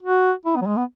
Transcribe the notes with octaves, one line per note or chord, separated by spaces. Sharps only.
F#4
E4
B3
F#3
G#3
B3